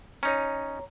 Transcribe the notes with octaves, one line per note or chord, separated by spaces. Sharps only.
C#4 D#4 C#5 A#5